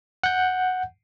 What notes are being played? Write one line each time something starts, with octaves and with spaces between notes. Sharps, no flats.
F#5 G6